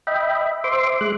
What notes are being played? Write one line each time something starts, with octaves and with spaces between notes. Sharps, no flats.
D#5 E5 G5 B5
C5 E5 C6 D6
G#3 F#6